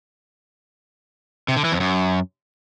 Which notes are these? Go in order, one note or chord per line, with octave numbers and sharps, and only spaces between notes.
C3
D3
E3
F2
F#2